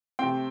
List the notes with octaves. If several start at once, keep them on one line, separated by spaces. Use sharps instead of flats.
C3 A3 C4 G5 C6